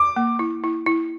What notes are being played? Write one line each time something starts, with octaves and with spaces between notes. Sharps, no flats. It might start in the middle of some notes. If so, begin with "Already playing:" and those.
Already playing: D6
A#3
E4
E4
E4